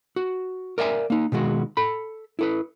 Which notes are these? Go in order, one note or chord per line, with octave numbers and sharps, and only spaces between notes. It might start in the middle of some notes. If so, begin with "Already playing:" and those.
F#4
A#4 D5 E5 F5 G#5
A#3 D#4
B2 D#3 G#3 F#4
A4 B5
E4 A4 B4